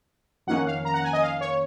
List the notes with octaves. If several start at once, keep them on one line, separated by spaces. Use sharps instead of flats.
F2 D#3 A#3 C#4 F#5
F5
A#5
F#5
G#5
D#5
F5
C#5